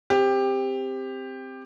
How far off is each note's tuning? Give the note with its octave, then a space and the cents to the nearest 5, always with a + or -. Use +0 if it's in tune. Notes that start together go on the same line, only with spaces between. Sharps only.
C4 +0 G4 +15